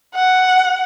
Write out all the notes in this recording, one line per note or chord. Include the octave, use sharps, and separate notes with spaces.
F#5